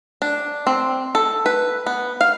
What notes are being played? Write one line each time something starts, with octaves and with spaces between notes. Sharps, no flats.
D4
C4
A4
B4
B3
F5